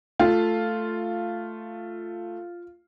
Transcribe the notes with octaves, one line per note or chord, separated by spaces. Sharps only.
A3 F4